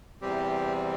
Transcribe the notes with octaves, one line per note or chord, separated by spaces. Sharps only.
E2 C3 E3 G3 C4 G4